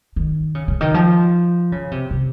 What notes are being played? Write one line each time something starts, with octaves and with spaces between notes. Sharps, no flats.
D#3
C#3
C#3
D#3
F3
C#3
C3
C3